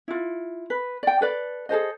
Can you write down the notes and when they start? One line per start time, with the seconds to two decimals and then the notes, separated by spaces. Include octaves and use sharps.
0.08 E4 F4
0.70 B4
1.03 D5 G5
1.21 A4 B4 D5
1.69 G#4 A4 C5 D#5